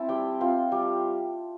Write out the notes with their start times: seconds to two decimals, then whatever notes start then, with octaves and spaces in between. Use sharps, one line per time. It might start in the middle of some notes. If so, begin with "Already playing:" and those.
Already playing: C4 E4 A5
0.09 G3 G5
0.41 C4 F4
0.72 G3